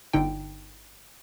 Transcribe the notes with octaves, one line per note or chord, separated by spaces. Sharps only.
G1 D3 D#4 G5